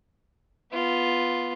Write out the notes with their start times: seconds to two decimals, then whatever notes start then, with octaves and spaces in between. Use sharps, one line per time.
0.72 B3 F4